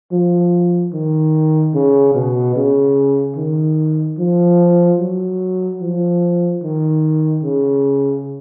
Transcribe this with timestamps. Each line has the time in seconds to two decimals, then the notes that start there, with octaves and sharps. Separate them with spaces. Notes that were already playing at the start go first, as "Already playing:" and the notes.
0.12 F3
0.93 D#3
1.74 C#3
2.15 B2
2.56 C#3
3.36 D#3
4.18 F3
5.00 F#3
5.81 F3
6.63 D#3
7.44 C#3